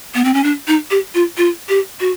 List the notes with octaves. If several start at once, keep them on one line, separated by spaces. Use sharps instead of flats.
B3
C4
C#4
D4
D#4
G4
F4
F4
G4
F#4